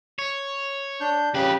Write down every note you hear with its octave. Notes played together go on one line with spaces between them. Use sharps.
C#5
D4 G6
F2 C#3 G4 B4